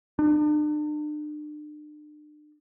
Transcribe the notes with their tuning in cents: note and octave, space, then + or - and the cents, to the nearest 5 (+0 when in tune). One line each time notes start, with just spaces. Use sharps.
D4 +40